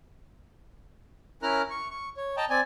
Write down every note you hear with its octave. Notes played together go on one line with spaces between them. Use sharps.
C#4 E4 A#4 A#5 F6 F#6
C#6
C#6
C#5
D#5 G5 A5 A#5
C4 D5 G#5